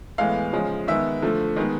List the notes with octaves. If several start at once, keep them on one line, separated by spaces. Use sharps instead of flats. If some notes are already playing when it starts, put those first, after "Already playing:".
A2 E3 G#3 B3 F5
C#3 F3 G#3
D#3 G#3 B3 E5
D3 F3 A3
D#3 G#3 B3